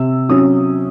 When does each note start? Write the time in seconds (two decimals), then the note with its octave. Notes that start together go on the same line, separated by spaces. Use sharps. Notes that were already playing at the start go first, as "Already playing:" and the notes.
Already playing: C3 E6
0.29 F#3 C#4 D#6